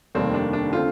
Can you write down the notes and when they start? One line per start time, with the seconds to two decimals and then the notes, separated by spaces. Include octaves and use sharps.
0.15 F1 D#2 D#3 G3 A#3 C4
0.34 D4
0.53 D4
0.73 D3 A3 C4 F4